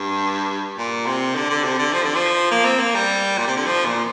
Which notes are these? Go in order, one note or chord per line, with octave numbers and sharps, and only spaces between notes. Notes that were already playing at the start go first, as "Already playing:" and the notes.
Already playing: G2
A#2
C3
D3
D3
C3
D3
F3
D3
F3
A#3
C4
A#3
G3
A#2
C3
D3
F3
A#2